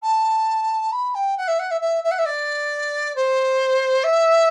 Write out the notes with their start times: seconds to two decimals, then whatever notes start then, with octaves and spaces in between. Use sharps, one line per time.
0.02 A5
0.92 B5
1.14 G5
1.37 F#5
1.47 E5
1.59 F#5
1.70 E5
1.81 E5
2.03 E5
2.11 F#5
2.18 E5
2.25 D5
3.15 C5
4.03 E5